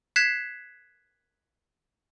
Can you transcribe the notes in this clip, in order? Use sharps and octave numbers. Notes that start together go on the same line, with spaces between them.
F#6 G#6 B6 C7 E7